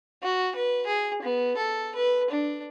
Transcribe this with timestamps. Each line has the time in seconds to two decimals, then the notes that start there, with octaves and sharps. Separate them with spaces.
0.23 F#4
0.56 B4
0.87 G#4
1.22 B3
1.57 A4
1.95 B4
2.30 D4